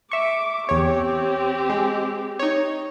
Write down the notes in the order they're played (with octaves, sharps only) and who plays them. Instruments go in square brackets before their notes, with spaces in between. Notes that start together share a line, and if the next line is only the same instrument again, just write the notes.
[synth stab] E5 C#6 [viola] D6
[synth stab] E2 C#5 [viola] C4 G4
[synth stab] G#3
D#4 C#5